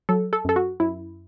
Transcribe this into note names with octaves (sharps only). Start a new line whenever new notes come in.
F#3 A4
A4
F#2 A4
F#4
F#2 E4